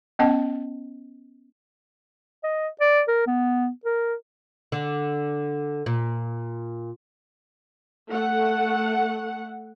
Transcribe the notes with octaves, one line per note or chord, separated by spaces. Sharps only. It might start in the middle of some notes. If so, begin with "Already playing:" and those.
B3 C#4 D#5 F#5 A5
D#5
D5
A#4
B3
A#4
D3
A#2
A3 F#5